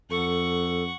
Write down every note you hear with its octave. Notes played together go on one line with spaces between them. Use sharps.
F2 A4 F#5 C#6